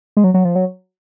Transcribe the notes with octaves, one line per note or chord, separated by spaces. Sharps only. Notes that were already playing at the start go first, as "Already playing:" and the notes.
G#3
F#3
F#3
F3
F#3